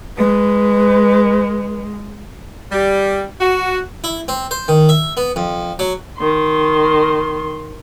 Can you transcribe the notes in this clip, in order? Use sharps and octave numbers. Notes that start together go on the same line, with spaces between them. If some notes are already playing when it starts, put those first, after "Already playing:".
G#3 B4
G3
F#4
E4
C4
C5
D#3
E5
B3
F2
F#3
D#3 C6